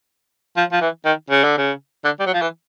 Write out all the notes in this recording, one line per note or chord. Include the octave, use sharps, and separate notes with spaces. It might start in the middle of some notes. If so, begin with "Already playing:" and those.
F3
F3
E3
D#3
C#3
D3
C#3
D3
G3
F#3
F3
E3